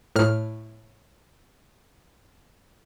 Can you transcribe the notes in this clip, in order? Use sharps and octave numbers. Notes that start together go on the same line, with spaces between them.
A2 F6